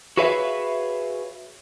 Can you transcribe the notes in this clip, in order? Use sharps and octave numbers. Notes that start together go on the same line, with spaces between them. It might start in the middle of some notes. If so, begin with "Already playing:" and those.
F#4 G#4 B4 C#5 E5 F5